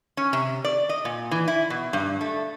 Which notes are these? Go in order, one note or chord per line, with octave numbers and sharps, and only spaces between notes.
C#4
C3
D5
D#5
A#2
E3
E4
B2
G2
A3